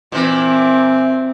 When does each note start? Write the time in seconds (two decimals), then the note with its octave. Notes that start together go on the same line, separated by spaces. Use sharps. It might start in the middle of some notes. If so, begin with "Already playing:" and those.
0.12 A#2 E3 C4